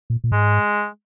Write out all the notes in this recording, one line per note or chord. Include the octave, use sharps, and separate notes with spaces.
A#2
A#2
G#2 G#3